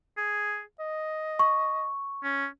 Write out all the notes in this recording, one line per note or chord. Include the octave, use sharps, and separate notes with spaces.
G#4
D#5
C#6
C#4